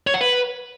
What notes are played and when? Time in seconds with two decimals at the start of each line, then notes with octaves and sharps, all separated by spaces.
0.07 C#5
0.14 F#5
0.21 B4